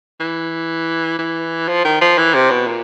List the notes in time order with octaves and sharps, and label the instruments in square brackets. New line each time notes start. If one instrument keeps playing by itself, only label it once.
[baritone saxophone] E3
E3
F3
D#3
F3
E3
C3
B2
A#2